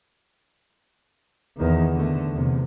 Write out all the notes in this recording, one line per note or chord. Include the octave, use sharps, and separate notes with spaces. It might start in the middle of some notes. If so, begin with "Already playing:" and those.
E2 D#3
D3 A3
E2 C3